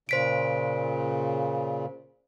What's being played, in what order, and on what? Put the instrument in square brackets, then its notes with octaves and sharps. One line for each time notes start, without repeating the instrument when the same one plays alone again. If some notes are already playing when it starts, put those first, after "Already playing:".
[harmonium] A#2 C#3 [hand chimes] C5 B6 D7